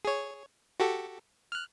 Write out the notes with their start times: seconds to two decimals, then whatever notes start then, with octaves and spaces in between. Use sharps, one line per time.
0.05 G#4 C#5
0.80 F#4 G4 A4
1.52 F6 F#6